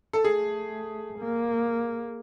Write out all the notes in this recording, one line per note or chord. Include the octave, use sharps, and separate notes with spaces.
A4
A3 G#4
A#3